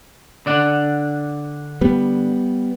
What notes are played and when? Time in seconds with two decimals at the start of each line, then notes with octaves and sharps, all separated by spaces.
0.46 D3 D5 F#5
1.81 G3 B3